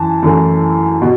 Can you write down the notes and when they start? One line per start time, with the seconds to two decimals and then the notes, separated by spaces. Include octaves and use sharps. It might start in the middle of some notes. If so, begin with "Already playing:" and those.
Already playing: F#2 E3 A5
0.23 F#2 E3 A3
1.02 B2